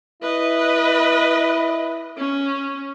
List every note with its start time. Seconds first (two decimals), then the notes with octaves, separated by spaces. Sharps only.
0.23 E4 B4 D#5
2.18 C#4